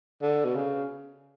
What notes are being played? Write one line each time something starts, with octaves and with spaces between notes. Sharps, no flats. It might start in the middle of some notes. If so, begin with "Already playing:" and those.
D3
B2
C#3